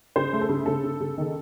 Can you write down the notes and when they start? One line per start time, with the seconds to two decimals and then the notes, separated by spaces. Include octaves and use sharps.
0.16 C#3 C5
0.33 A3
0.41 A4
0.49 C#3
0.66 C#3 A4
0.83 C#3
1.00 C#3
1.18 D#3